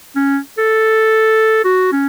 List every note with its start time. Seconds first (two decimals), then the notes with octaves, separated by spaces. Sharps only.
0.16 C#4
0.58 A4
1.64 F#4
1.92 C#4